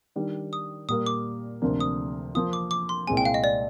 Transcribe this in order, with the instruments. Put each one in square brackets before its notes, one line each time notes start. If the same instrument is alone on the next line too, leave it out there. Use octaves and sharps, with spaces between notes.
[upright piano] D#3 G3 D4
[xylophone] D#6
[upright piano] A#2 G3 A#3 [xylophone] D#6
[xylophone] D6
[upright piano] D2 C3 F3 A#3 D4
[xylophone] D#6
[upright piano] F3 A#3 F4 [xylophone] D#6
[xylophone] D6
D6
C6
[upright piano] C2 A#2 G#3 C4 [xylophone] G#5
[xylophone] G5
F5
D#5
D5